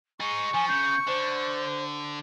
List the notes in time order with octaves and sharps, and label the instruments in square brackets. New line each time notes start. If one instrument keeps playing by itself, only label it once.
[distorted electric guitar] D#4 G#4 [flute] C#6
[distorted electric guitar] F3 [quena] G#5
[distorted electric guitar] C#3 [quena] G6
[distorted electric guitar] D3 [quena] C5